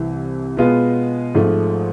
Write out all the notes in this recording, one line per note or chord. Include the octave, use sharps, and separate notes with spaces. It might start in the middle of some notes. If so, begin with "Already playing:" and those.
Already playing: C2 C3 E3
B2 G#3 B3 F4
G#1 G#2 F3 A3